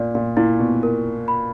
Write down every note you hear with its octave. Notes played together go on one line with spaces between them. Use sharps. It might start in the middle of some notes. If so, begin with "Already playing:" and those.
Already playing: A#2 D5
A#2
A#2 E4
B2
A#4
B5